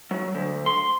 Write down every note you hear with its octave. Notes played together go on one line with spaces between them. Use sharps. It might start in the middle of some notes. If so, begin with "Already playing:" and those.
F#3
D2
C6